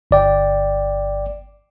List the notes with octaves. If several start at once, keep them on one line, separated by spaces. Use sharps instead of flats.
G1 D5 G5